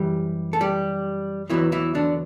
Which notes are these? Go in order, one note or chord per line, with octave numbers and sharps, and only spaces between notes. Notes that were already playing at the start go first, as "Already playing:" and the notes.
Already playing: F#2 E3 G3 G4
A4
G3 G4
E2 B2 E3 F#3 E4
E3 E4
D3 D4